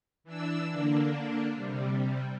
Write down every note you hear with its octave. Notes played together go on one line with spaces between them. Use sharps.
E3 D4 E6
D3 A#3 D4
C3 G3